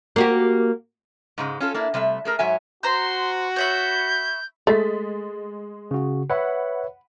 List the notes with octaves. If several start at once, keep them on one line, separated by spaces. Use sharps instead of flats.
A#3 F#4 G4
G#2 C#3 G#3
C#4 F4 A4
A#3 D4 E4
C3 G3 A3 E5
A3 G#4 A#4
G#2 F#3 C#5 E5 G#5
F#4 C5 A#5 C6 G6
C#5 E5 B5 G6
G#3 A3 A6 B6
C#3 F#4
B4 C#5 E5 F#5 B5